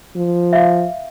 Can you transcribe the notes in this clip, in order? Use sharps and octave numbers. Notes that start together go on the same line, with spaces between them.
F3
E5 F5